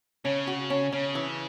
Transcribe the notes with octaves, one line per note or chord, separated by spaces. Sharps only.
C#3 C#4
F#4
C#4
C#3 C#4
E3